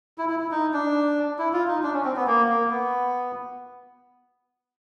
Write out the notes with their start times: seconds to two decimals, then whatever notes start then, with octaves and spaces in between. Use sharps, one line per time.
0.18 E4
0.29 E4
0.40 E4
0.51 D#4
0.73 D4
1.38 E4
1.53 F4
1.68 D#4
1.83 D4
1.94 C#4
2.04 C4
2.16 B3
2.27 A#3
2.48 A#3
2.70 B3